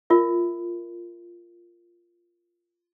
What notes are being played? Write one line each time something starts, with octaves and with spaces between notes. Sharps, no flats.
F4 A#4 E5